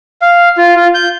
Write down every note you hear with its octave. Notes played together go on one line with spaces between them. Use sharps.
F5
F4
F4
G6